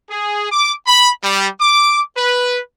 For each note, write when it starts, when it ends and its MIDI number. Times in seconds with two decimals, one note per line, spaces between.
0.10 0.47 68
0.51 0.73 86
0.86 1.09 83
1.23 1.46 55
1.60 2.00 86
2.16 2.58 71